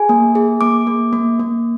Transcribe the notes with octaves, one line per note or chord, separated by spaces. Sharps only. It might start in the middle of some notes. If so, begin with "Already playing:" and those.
Already playing: G#4 G#5
A#3
G#4
A#3 D6
A#3
A#3
A#3